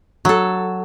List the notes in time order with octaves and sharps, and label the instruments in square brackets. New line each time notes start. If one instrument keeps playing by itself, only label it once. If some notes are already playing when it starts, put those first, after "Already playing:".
[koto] F#3 A4